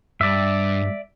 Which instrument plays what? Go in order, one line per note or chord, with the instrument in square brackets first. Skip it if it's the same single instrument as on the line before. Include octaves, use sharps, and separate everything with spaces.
[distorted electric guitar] G2 [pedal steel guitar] D5 E5